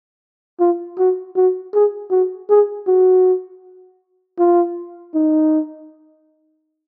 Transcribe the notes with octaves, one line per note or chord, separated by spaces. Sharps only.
F4
F#4
F#4
G#4
F#4
G#4
F#4
F4
D#4